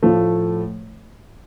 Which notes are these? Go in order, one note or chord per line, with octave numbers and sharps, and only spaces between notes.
A2 F3 A3